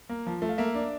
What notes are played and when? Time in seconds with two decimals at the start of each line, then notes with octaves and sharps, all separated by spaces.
0.09 A#3
0.27 F3
0.42 A3
0.49 F5
0.58 A#3 E5
0.75 D4